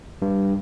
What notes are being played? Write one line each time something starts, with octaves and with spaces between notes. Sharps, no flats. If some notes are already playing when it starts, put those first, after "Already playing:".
G2